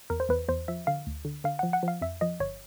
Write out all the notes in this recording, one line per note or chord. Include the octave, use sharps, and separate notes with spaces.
E2 A#4
C5
E2 B4
E2 C5
F3 E5
D3 F5
D2
D3
D3 F5
F3 F#5
F#5
F3 F5
F2 E5
F3 D#5
G1 C#5